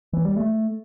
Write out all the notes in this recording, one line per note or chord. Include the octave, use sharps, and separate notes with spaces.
E3
G3
A3